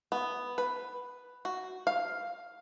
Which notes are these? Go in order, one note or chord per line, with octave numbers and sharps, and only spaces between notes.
B3
B4
F#4
F5